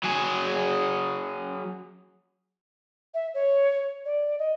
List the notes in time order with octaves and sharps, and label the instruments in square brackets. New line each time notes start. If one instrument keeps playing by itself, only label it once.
[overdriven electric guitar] F#3 G#4
[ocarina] E5
C#5
D5
D#5